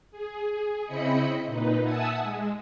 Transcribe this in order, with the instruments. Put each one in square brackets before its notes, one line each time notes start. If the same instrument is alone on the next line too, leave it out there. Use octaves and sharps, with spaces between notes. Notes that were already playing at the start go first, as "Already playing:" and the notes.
[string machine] G#4
C#3 C4 E4 D#5 B5 C#7
A#2 D#4 B4
E5 F#5 G#5 A5 D#6 E6
G#3